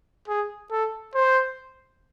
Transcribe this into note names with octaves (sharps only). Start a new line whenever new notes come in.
G#4
A4
C5